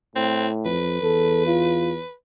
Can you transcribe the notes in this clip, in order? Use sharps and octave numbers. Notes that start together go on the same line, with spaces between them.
A2 C4
F2 B4
E2 A4
F4